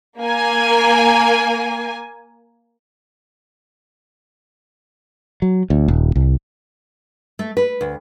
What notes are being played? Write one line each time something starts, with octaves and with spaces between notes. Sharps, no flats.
A#3 G#5
F#3
D2
D#1
C2
A3
B4
D2